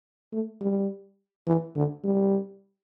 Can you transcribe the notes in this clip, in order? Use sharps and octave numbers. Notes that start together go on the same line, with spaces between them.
A3
G3
E3
D3
G3